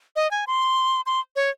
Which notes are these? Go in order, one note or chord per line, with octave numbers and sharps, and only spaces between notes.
D#5
G#5
C6
C6
C#5